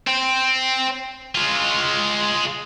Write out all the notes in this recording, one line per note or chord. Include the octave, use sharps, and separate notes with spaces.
C4
G#3 F4